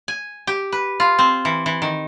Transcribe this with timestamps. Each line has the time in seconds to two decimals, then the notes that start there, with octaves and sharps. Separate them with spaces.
0.08 G#5
0.47 G4
0.72 B4
1.00 F4
1.19 C4
1.45 E3
1.66 E3
1.82 D#3